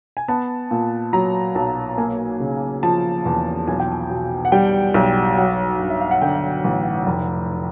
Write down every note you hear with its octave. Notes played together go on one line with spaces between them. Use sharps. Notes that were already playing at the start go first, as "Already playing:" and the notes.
G#5
B3 A5
A#2
F#3 A#5
B1 A5
A#3 G#5
C#3
F3 A5
E2
B1 G#5
G5
G#5
B2
F#5
G3 G5
B1
F#3 F#5
G2
E5
F5
F#5
D3 G5
A1
F1